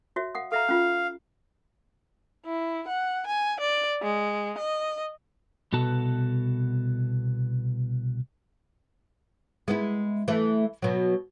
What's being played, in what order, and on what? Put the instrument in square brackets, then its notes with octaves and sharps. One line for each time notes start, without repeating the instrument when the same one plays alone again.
[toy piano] F#4 C#5 E5
F5 F#5 D#6
[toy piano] A4 E5 A#5 [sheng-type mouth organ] F5
[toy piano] C#4 F4
[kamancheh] E4
F#5
G#5
D5
G#3
D#5
[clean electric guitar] C2 B2 B3 F#4 A4 A5
[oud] G#3 B3 E4
E3 A3
B2 F#3